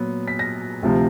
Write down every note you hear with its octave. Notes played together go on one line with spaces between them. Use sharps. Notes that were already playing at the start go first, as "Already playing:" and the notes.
Already playing: A#2 F#3 B3
B6
A#6
D2 C3 F3